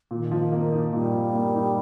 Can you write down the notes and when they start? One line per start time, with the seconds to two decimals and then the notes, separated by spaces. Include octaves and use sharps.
0.11 A#2 D#3
0.31 F3
0.52 A#3
0.72 D#4
0.93 A#2 G3
1.14 F3
1.34 A#3
1.55 D#4